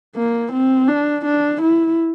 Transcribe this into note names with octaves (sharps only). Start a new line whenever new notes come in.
A#3
C4
D4
D4
E4